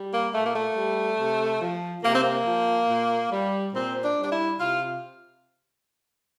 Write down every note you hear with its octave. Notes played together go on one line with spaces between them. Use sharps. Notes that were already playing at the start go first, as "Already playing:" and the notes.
Already playing: G3
A#3
A#2 A3
A#3
A3
G3
C3
F3
C3 A#3
C4
A#3
F3
A#2
G3
A#2 C4
D4
G3
D4
E4
C3 F4